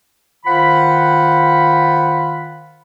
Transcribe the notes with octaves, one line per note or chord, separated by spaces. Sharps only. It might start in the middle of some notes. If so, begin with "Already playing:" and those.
D#3 F4 C5 F#5 B5